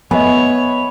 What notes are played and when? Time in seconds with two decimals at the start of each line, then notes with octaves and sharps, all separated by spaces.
0.11 B3 B4 C#5 D#5 E5 G#5